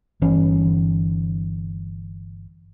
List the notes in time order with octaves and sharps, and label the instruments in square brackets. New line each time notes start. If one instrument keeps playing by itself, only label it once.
[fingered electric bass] G1 E3 C#4